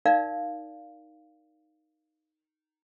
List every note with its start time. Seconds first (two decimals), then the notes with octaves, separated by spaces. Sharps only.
0.05 D#4 A#4 D5 F5